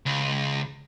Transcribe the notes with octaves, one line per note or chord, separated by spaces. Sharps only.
C#2